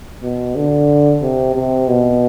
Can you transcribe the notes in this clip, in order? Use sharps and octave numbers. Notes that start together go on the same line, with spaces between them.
B2
D3
C3
C3
B2